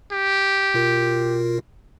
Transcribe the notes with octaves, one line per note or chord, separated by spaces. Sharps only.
G4
B2 F4 A#4